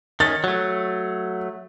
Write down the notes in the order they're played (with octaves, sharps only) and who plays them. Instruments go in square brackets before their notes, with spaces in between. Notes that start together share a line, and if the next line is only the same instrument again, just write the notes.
[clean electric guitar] D#3 C#4 [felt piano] A6
[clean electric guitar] F#3 A3